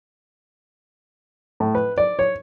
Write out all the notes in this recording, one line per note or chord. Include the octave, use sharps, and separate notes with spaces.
A2
B4
D5
C#5